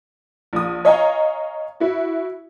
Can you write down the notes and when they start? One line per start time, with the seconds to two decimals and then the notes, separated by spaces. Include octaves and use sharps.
0.53 A#1 D#6
0.85 C#5 D#5 F5 G#5 A#5
1.80 E4 F#4